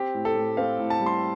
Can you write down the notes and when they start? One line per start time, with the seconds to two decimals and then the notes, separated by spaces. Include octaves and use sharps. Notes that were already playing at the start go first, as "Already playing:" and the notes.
Already playing: C4 G4
0.14 A2
0.25 A4
0.35 A2
0.57 C4 F5
0.79 A2
0.90 A5
1.00 G3
1.06 C6